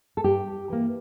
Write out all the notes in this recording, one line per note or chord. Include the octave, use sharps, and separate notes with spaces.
A4
G2 G4
E3 A#3